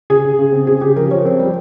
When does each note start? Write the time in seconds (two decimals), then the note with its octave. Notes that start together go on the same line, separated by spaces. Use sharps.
0.10 C#3 G#4
0.24 C#3
0.38 C#3
0.52 C4
0.67 C#3 G#4
0.81 C#3 G4
0.96 F3 A#4
1.11 F3 C#5
1.26 C4
1.39 G3 A#4